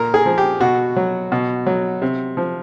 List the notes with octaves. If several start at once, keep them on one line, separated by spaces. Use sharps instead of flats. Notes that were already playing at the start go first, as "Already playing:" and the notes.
Already playing: A#2 A#4
G#4
F3
G4
B2 F#4
F#3
B2
F#3
C3
F3